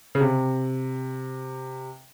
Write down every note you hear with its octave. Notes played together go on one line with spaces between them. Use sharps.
C#3
C3